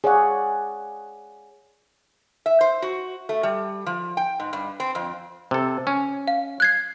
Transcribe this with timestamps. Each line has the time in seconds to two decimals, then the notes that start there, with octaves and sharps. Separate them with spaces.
0.04 G#4 C#5 D5 F5 F#5
2.46 E5
2.61 C5
2.82 F#4
3.29 A3
3.43 G3
3.86 F3
4.17 G5
4.40 G#2
4.53 G2
4.80 C4
4.95 F2
5.51 C3 A4
5.87 C#4
6.28 F5
6.60 F#6 G#6 C7